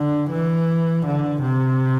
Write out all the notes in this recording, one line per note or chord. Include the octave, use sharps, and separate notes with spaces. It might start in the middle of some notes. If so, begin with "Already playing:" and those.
Already playing: D3
E3
D3
C3